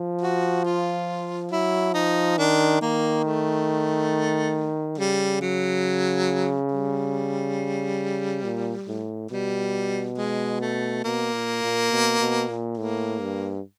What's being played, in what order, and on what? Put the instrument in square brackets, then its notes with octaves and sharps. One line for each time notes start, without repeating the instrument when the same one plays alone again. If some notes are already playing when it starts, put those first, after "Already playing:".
Already playing: [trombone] F3
[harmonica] F#4
F4
[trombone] F#3 [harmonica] E4
[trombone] F3 [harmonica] D#4
[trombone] D#3 [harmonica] D4
[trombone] D#3 [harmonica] A#3
[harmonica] A3
[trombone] C#3 [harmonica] G3
[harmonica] F#3
G3
[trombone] A#2
A2
[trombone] B2 [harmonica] G3
[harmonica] G#3
A3
[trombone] B2 [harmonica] A#3
[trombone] A#2
A#2
B2
B2
A#2
[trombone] A2 [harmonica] A#3
[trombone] G2